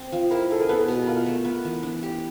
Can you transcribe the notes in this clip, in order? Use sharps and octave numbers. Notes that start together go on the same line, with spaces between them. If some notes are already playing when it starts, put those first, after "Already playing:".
Already playing: C4
F3
E4 A#4
G#4 A4
A#4
B3 A4 B4
B2
F4 A#4
A3
B3 A#4
E3
D4
G4